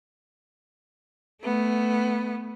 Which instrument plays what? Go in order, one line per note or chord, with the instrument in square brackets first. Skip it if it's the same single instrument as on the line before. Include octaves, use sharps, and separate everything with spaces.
[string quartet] A3 B3